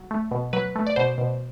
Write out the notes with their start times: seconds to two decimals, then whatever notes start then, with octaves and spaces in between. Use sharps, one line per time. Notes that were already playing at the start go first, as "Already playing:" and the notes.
Already playing: F#3
0.11 A3
0.31 B2
0.53 F#3 B4
0.75 A3
0.86 D5
0.96 B2 C5
1.18 B2